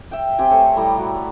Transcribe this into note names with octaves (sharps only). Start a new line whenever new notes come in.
E5 G5
C4 G4 G5 G#5
A3 C5 C#5
A2 G3 A#5 B5
F#4
D5